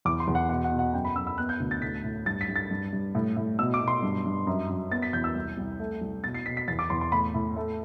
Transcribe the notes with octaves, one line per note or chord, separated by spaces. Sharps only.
E2 D6
C6
E2
F#5
B2 F#5
F#5
B2
F#5
F#2 G5
B5
F#2 E6
E6
B3 F#6
G6
D2
A6
A2 B6
A2
G2 A6
B6
G2
A6
G2
G2
A2
A2
B2 E6
D6
B2
C6
G2
G2
F#2
F#2
B3 A6
B6
E2 G6
E6
C2
C2
A3
C2
B2 A6
C7
B2 B6
B6
E2 A6
D6
E2 C6
C6
A2 B5
A2
A3